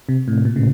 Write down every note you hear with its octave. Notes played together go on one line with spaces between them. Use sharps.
C3
A2
A#2
C#3